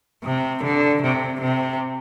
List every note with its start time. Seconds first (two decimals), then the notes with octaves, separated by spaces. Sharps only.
0.24 C3
0.63 D3
1.02 C3
1.41 C3